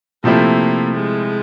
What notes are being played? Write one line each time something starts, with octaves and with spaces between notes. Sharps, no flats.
C3 F3 A3 A#3 C4 E4
G#3